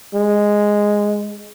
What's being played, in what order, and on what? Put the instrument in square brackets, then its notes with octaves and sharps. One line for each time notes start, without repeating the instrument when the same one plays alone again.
[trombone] G#3